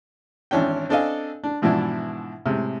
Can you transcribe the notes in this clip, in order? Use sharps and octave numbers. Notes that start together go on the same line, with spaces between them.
G#1 E3 C#4 D4 G5
C4 D4 A4 D#5 F5 G#5
D4
G#2 B2 E3 F3 D4 E4
A2 C3 G#3